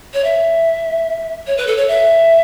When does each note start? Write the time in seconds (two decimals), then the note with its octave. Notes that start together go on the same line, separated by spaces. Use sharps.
0.14 C#5
0.24 E5
1.47 C#5
1.57 B4
1.67 A4
1.77 C#5
1.88 E5